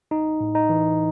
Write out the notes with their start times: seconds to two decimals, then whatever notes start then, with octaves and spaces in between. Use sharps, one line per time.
0.11 A1 D#4
0.40 A2
0.55 D#4
0.69 E3